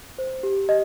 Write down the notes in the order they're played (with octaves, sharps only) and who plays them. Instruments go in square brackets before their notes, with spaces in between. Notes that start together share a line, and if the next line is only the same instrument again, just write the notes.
[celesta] C5
G4
G4 D#5